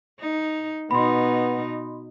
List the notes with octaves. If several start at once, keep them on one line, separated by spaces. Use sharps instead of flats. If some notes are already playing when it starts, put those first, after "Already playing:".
D#4
B2 B3 D#4 B5 C6